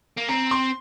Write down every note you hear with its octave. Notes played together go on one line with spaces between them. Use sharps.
A#3
C4 A#5
C6